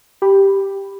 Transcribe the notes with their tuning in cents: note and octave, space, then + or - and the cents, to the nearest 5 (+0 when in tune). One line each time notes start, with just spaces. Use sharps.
G4 +0 B5 +0